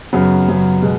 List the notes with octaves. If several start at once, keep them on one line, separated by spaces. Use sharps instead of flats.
F#2 C#3 F#3 B3
F#2 C#3 F#3 B3
B2 G#3